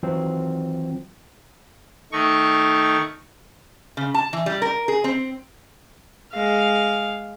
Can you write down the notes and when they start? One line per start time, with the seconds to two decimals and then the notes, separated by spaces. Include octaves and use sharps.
0.03 D#3 E3 F#3 C4 F4
2.12 D#3 A3 D#4 C#6
3.97 C#3
4.14 A5
4.33 E3
4.46 G3
4.62 A#4
4.88 G#4
5.04 C4
6.33 G#3 F5